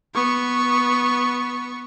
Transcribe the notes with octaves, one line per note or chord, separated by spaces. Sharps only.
B3 C#6